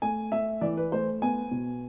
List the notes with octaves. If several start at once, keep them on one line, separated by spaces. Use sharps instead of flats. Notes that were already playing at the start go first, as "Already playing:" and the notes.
A3 G#5
A3 E5
E3 D5
B4
A3 C5
B3 G#5
B2